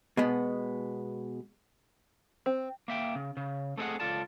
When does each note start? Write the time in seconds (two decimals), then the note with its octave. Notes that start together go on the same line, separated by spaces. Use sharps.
0.17 B2 G#3 B3
2.46 C4
2.88 A#3 E5 G5
3.15 C#3
3.37 C#3
3.77 A3 C4 E4 G#4 D#5 F#5
4.00 C#2 F4 A4 D5 A5